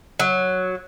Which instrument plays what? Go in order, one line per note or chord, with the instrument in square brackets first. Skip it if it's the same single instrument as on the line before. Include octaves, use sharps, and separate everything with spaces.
[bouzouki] F#3